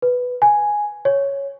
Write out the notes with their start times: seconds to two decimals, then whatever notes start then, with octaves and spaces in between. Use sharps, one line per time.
0.02 B4
0.42 G#5
1.05 C#5